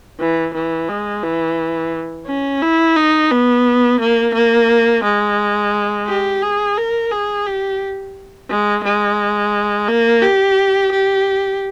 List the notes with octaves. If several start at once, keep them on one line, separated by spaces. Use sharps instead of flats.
E3
E3
G#3
E3
C#4
E4
D#4
B3
A#3
A#3
G#3
G4
G#4
A#4
G#4
G4
G#3
G#3
A#3
G4
G4